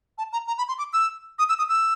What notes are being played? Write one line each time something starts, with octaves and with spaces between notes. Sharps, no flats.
A5
A#5
A#5
B5
C6
D6
E6
D#6
E6
D#6
E6